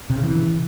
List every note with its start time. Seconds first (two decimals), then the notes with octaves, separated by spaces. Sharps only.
0.10 C3
0.16 C#3
0.23 E3